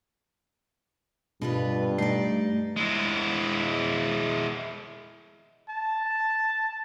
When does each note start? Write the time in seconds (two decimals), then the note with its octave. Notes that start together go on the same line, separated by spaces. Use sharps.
1.42 G2 B2 F4 B4
1.98 A3 D#4 D5
2.76 G#3 E4
5.69 A5